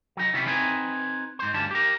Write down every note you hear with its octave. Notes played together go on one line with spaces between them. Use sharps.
F#3 D#4
C3 E3 G3 B3 C#4
C4 D#4 B4 G#5
G#2 C5
D2 G2 G3 C#4 A5
G4 A#4